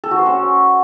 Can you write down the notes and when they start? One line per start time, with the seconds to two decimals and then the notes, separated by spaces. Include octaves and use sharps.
0.04 A4
0.11 F#4
0.19 C5
0.26 C#4